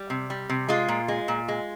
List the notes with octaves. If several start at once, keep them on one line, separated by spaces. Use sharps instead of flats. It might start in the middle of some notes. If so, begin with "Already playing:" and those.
Already playing: G3
C3
G3
C3
G#3 F4
A#2
G#3
A#2
G#3